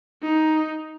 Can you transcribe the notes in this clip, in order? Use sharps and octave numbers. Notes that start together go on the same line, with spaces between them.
D#4